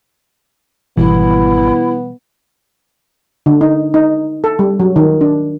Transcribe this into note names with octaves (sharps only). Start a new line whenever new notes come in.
G#1 B2 E3 G3 B3 E4
D3
D#4
D#4
A4
G3
F#3
D#3
D4